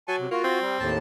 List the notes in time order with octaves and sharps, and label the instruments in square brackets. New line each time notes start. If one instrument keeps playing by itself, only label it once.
[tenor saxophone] F#3 [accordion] G#5 A5 C#6
[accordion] C3
[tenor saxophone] A#3 [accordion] F4 F#4
[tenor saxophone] C4
[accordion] G3
D#2 A2 A5